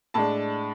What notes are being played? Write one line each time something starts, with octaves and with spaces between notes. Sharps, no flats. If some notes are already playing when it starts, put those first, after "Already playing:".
A2 G#3 D4 A5